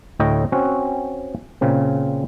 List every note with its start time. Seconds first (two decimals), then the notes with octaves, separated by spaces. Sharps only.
0.19 D2 A2 C#5 D#5 G5
0.52 C4 C#4 F#4
1.61 A#2 C#3 C4